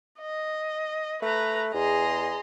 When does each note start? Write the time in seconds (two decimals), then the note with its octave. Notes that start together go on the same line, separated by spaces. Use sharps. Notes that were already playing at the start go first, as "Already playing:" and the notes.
0.20 D#5
1.22 A3 B4 A#5
1.74 E2 G#4 D#5 A#5 C6